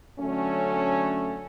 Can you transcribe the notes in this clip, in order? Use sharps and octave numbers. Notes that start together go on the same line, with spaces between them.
D3 F#3 A3 C#4